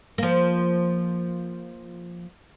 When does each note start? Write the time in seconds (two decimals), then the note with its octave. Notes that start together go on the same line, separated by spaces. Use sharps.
0.18 F3 A#3